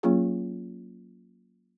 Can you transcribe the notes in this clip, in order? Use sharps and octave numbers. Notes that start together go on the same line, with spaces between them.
F#3 A#3 C#4 F4 G#4